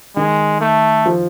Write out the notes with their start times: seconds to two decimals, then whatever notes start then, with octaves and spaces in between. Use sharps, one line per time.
0.16 D#3 G#3
0.61 A3
1.06 F3